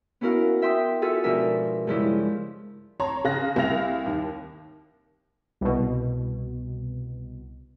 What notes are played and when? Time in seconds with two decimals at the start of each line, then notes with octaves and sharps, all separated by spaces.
0.21 B3 C#4 E4 F#4 A#4 F5
0.62 E5 G5 C6 D#6
1.02 F4 F#4 G#4 A4 E5
1.24 G#2 B2 F3 D4 A#4 E5
1.87 G2 C#3 F3 G#3 E4 G4
3.00 C#5 A5 A#5 C6
3.24 C#3 F5 F#6 A#6
3.56 C2 E5 F5 A#6 F7
4.06 D#2
5.61 C2 B2